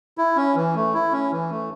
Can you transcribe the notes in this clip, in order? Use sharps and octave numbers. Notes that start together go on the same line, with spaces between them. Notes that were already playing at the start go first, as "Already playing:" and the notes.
E4
C#4
E3
A3
E4
C#4
E3
A3